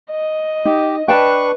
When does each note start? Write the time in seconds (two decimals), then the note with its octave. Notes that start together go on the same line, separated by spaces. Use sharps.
0.11 D#5
0.65 D#4 G4
1.08 D4 B4 G5 A5 C#6 F#6